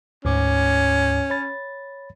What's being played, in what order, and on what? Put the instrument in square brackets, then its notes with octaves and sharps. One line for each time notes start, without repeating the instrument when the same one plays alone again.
[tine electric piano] D2 G#2 D6 [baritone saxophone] C#4
[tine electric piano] C#5 B5 A6